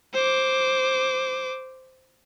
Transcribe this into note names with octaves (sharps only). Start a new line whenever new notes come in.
C5 D6